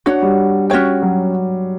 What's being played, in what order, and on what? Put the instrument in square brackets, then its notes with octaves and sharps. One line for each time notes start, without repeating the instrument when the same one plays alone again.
[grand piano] D4 [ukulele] F#4 C#5 F#5
[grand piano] G3
[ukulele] C#4 F#4 C#5 G5
[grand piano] F#3